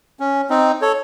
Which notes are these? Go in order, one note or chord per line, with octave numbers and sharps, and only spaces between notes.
C#4
C4 D#4
A4 C#5